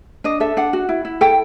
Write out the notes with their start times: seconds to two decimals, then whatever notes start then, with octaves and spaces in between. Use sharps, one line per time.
0.24 D4 D#5
0.40 A4 E5
0.57 D4 F#5
0.73 F#4
0.89 E4
1.05 E4
1.21 A4 G5